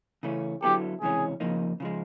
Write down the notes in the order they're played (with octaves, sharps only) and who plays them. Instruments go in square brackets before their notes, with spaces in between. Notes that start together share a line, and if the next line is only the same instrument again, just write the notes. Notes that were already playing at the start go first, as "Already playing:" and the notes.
[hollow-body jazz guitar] C#3 E3 A3 C#4
[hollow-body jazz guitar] D3 F#3 B3 E4 A4 [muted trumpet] G4
[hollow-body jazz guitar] C#2 C3 E3 G#3 C#4 [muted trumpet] G#4
[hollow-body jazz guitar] F2 C#3 F3 A#3 D#4
C#3 F3 G#3